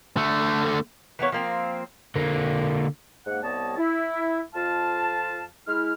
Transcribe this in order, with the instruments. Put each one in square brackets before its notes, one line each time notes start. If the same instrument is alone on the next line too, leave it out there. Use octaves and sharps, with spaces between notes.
[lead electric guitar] D3 A3
[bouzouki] E3 A#3 B3 C#5
F3 A#3 C4
[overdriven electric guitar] D3 A#3
[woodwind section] G#2 A#3 F#5
C2 G3 B3 C#5 D#5 A5
E4
F2 F4 F5 A5
G#3 E4 F6